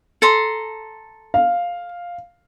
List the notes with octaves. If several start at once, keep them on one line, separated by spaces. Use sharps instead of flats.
A4 A#5 C6
F5